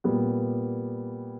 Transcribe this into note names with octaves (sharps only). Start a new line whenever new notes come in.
A#2 G3 B3